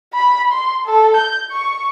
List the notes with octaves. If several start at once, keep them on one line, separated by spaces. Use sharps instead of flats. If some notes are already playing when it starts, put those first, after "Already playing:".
B5
C6
A4
G6
C#6